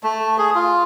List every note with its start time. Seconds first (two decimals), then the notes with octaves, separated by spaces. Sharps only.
0.03 A3
0.38 G#4
0.55 F4